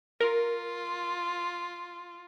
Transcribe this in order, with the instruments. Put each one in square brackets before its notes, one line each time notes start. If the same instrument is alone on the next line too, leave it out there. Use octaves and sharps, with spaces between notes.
[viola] F4 [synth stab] A#4